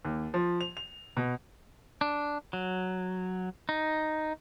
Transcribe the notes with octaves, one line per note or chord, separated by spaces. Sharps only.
D#2
F3
F7
F7
B2
D4
F#3
D#4